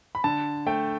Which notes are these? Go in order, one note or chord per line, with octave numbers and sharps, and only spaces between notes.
B5
D3 A5
A3 G5